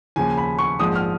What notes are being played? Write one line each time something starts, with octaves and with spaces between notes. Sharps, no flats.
D#2 C#3 F3 G#5
B5
C#6
A#1 G#2 F3 G#3 D#6
F6